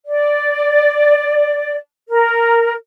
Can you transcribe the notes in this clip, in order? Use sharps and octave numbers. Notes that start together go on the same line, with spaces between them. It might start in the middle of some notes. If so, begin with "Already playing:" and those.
D5
A#4